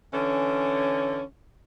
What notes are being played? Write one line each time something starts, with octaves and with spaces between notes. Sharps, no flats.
D3 E3 C#4